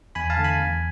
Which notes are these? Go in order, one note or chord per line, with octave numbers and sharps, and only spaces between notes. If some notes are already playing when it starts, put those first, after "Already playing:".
E2 G#5 B5
F5 A5
D3 A3
G#5 B5
E2